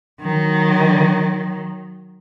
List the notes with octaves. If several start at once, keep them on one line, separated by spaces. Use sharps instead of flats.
D#3 F#3